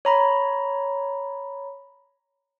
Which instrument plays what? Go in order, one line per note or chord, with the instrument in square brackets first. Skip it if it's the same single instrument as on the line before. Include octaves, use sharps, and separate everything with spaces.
[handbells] C#5 A#5 B5